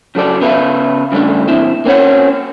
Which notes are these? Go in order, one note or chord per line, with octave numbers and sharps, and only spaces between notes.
C#3 F#3 A4 D5
C#3 B3 B4 E5 F5
C#3 G3 A3 D4
A#2 E3 C4 E4
A#3 C4 C#4 C#5 F#5